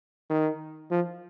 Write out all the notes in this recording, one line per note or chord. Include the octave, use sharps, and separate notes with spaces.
D#3
F3